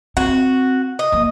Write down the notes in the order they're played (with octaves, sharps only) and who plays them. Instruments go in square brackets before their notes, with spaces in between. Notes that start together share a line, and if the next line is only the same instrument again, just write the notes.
[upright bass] C4 [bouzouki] F#4
[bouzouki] D#5
[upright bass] F3 A#3